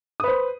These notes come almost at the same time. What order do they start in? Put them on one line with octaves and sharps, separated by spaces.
D#6 B4 C5